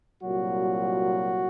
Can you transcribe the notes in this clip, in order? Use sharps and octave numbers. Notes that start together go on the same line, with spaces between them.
C2 A#2 F#3 F#4